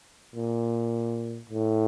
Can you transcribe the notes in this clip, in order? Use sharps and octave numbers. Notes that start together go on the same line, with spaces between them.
A#2
A2